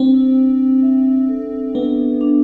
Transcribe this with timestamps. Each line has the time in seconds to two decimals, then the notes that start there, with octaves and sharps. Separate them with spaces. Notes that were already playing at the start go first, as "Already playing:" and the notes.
Already playing: C4 D4
0.37 D4
0.82 E5
1.29 A4
1.75 B3 D4
2.21 D4